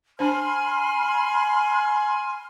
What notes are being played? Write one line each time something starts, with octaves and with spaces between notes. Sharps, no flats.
D4 C5 G#5 B5 C6 F6